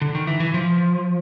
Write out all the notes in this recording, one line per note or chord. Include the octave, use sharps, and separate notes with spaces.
D3
D#3
E3
E3
F3